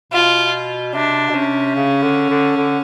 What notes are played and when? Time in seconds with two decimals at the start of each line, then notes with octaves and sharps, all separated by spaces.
0.12 B2 F4
0.94 C3 D4
1.29 B2
1.34 C3 C#4
1.75 C#3
2.02 D3
2.30 D3
2.56 D3